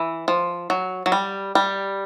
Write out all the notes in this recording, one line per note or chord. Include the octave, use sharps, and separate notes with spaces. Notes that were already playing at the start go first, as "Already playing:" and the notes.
Already playing: E3
F3
F#3
F#3
G3
G3